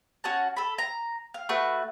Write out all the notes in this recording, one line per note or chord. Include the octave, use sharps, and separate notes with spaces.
C#4 F#4 F#5 A5
A4 B5
A#5
F5
A3 F#4 B4 F#6